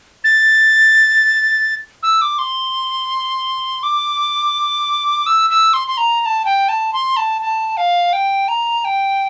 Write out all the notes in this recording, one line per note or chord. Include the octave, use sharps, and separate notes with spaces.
A6
E6
D6
C6
D6
E6
E6
C6
C6
A#5
A#5
A5
G5
A5
C6
A5
A5
F5
G5
A#5
G5